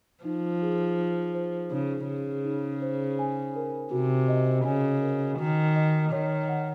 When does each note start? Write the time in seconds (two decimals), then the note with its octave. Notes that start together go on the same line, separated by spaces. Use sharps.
0.24 F3 D#4
0.62 G#4
0.99 D#4
1.35 C5
1.71 C#3 D#4
2.08 C#3 G#4
2.45 D#4
2.82 C5
3.19 G#5
3.56 A#4
3.91 C3 F#4
4.28 D#5
4.65 C#3 G#5
5.02 A#4
5.39 D#3 F#4
5.76 D#5
6.12 D#3 C#5
6.48 F#5